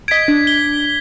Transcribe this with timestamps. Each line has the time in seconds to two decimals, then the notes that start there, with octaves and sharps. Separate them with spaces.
0.08 D#5 G#6 B6 D7
0.28 D4
0.47 G7